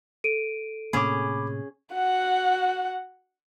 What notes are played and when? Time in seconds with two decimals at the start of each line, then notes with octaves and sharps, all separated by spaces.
0.24 A4 D7 D#7
0.93 A2 C3 A#3 C#4 G#4 B5 D6
1.95 F#4 F#5